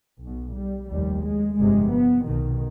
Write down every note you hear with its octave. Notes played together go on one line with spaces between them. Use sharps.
B1 B2
G3
F1 D#2 G3
G#3
G1 F2 C3 G#3
B3
B1 B2 D#3